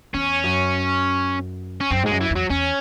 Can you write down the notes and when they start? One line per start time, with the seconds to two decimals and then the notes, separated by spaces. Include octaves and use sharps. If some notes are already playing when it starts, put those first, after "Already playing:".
0.14 E2 C#4
0.44 F#2
1.81 C#4
1.91 F#2 C4
2.03 G#2
2.06 F#2 G#3
2.21 E3
2.30 E2
2.36 F#3
2.50 E2 C#4